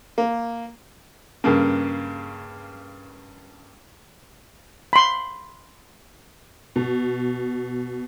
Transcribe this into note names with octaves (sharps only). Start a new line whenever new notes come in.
A#3
G2 C#3 A#3
B5 C6
B2